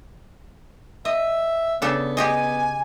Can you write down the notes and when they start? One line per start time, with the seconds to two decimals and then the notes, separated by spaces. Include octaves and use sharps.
1.05 D#5 E5
1.82 C#3 B3 D4 A4
2.17 G4 G#4 D#5 G#5